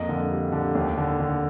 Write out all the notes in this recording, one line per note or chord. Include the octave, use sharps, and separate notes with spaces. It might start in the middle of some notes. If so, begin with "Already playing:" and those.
Already playing: F2 A#3 D#5
D3
G3
D3
D#2
D3
D3